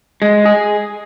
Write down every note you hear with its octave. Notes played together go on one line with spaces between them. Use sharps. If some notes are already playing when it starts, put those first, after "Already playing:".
G#3
G#4